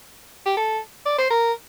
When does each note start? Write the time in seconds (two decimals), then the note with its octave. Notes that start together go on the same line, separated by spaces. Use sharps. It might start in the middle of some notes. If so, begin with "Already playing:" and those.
0.46 G4
0.57 A4
1.06 D5
1.18 C5
1.30 A#4